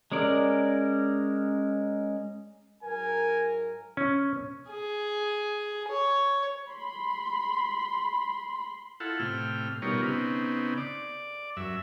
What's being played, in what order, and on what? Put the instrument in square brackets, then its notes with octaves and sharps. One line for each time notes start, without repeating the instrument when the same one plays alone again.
[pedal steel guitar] G#3 C#4 A#4 D5
[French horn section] G#2 F#3 A#4 [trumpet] G#5
[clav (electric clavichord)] C#4
[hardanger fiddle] G#4
C#5
[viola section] B5 C6
[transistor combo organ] E4 F4 A4 F#5
A2 C3 G5 F6
B2 G3 D#4 F4 A#4 C#5
C#3 B3 C4 D#4
D5
F#2 E5